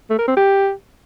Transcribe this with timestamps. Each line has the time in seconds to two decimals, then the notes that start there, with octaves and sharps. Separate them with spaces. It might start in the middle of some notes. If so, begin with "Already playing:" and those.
0.10 A3
0.19 A#4
0.28 C4
0.37 G4